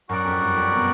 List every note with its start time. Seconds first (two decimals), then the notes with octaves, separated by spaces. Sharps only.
0.09 F#2 F#4 A#4 D5 F#5
0.25 F2
0.41 G2
0.56 F2
0.72 B2